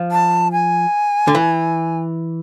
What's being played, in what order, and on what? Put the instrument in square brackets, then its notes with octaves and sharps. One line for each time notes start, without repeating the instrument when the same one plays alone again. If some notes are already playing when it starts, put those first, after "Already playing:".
Already playing: [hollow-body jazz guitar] F3
[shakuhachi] A5
G#5
[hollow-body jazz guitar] D3
E3